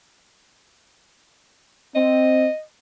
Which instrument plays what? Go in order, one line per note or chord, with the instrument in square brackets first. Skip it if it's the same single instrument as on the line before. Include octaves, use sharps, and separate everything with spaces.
[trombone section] C4 [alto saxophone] D#5